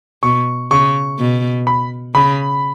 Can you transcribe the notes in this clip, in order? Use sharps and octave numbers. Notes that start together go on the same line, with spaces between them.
B2 C#6
C#3 C#6
B2
B5
C#3 B5